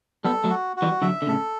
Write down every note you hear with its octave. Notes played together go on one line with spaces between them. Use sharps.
G3 B3 A4
F#3 A3
F#4
F#4
E3 G3
D3 F#3 E5
D3
A2 C#3 A4